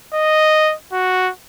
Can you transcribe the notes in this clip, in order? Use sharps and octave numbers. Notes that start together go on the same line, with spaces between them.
D#5
F#4